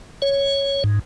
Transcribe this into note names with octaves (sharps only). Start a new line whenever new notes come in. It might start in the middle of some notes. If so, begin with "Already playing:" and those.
C#5
G#2